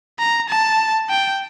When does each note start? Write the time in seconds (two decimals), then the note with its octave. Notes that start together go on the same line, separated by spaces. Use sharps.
0.19 A#5
0.49 A5
1.10 G5